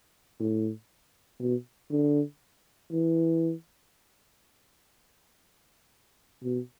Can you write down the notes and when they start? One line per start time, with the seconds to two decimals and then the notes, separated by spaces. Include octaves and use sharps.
0.40 A2
1.40 B2
1.91 D3
2.92 E3
6.44 B2